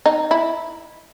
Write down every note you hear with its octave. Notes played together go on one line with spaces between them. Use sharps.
D#4
E4